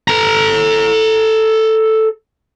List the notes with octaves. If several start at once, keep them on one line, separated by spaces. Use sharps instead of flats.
A4 A#5